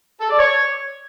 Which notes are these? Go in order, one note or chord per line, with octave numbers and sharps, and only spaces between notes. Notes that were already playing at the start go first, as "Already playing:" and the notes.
A4
D5
C#5